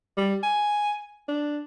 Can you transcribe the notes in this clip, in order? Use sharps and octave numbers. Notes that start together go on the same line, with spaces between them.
G3
G#5
D4